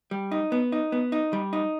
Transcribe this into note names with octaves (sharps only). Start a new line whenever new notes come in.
G3
D#4
B3
D#4
B3
D#4
G3
D#4